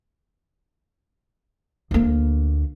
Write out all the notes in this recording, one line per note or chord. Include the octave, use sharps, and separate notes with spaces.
D2 A#3